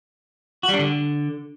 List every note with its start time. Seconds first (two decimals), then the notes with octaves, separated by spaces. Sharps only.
0.63 F#4
0.69 G3
0.74 D4
0.79 D3